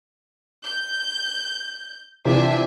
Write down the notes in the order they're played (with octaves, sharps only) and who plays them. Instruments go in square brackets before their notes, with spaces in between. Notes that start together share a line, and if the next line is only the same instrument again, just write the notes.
[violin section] G6
[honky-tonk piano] C3 E3 F3 [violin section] D4 E5 G#5